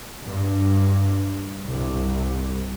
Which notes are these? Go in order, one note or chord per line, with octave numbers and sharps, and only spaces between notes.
G2
C2